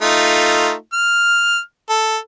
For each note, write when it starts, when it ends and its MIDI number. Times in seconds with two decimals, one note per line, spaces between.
0.02 0.73 57
0.02 0.73 63
0.02 0.73 65
0.93 1.59 89
1.89 2.17 69